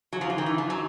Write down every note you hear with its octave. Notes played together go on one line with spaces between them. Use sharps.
F#3
F3
E3
D#3
E3
F3
F#3